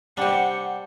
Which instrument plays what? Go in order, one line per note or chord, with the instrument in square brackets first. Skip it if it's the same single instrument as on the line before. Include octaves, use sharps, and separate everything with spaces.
[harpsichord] C3 G3 [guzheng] D4 G4 [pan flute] F#5